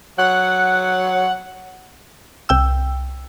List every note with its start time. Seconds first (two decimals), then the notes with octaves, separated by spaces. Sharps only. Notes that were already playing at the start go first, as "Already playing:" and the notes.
0.18 F#3 F#5
2.49 C2 G5 E6